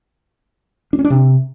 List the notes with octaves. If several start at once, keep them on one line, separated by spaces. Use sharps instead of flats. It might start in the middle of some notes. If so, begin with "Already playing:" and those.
D4
C#4
D4
C3